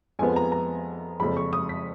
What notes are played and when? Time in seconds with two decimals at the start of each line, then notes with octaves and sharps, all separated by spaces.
0.19 F2 F3 G#3 B3 G#5
0.36 A#5
0.52 A#5
1.20 F#1 F2 F3 G#3 B5
1.37 C#6
1.53 D#6
1.69 B6